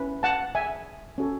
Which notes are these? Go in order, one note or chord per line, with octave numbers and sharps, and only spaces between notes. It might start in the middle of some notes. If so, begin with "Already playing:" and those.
Already playing: C#4 E4 B4
F#5 A5
E5 G#5
C#4 F#4 A4 C#5